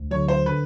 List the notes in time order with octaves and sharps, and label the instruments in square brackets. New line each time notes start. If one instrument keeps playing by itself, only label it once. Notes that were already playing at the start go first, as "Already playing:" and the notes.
Already playing: [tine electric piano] D2
[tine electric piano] D3 F#3 [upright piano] C#5
[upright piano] C5
[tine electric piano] D3 [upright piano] B4